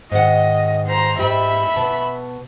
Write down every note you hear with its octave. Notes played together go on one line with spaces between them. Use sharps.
G#2 D#3 D#5 F#5
C5 A#5
G#2 G4 E5 B5
B2 A5